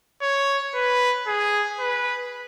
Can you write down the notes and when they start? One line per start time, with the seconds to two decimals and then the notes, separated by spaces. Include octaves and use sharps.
0.22 C#5
0.74 B4
1.27 G#4
1.80 B4